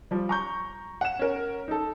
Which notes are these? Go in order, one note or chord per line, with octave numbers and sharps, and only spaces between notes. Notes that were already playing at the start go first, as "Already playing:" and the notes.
F3 G3
A#5 C#6 G6
F#5 E7
C#4 A#4
D#4 A4